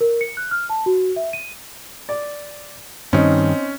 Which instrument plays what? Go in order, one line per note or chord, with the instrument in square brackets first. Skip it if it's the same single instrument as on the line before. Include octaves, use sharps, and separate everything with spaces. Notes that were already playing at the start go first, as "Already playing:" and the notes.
[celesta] A#4
C#7
F#6
F6
A5
F#4
E5
D#7
[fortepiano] D5
[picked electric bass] G2 D#3 [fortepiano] C4 D#4 [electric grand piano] C#4